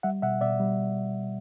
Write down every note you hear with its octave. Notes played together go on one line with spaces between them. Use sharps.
G3 E5 F#5
B2 E5 F#5
B2 D5 E5
G3